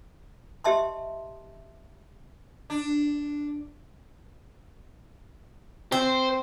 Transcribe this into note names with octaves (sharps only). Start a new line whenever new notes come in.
G4 D#5 E5 A5 C6
D4
C4 C5